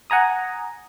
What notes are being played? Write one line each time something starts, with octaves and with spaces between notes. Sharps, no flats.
F#5 G#5 A#5 D#6